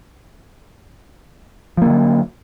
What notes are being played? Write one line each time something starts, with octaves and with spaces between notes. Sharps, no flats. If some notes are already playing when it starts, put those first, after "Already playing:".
D3 F3 F#3 A#3